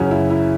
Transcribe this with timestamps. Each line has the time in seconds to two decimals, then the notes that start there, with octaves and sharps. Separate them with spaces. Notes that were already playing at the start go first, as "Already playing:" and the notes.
Already playing: F#2 C#3 E3 C#4 F#4
0.11 E4
0.30 E4